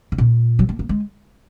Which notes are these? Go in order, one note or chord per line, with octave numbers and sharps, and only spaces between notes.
C#3
A#2
F#3
A#3
A#3
G#3